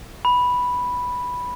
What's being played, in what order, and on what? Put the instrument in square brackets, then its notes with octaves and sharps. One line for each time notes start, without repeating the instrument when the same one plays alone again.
[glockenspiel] B5